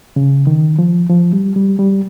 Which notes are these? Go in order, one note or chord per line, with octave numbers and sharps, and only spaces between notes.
C#3
D#3
F3
F3
G3
G3
G3